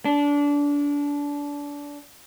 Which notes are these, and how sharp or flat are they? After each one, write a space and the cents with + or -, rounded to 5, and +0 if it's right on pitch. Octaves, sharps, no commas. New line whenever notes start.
D4 -25